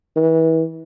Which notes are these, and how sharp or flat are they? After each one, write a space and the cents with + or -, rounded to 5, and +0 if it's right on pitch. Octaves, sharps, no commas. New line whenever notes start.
E3 -30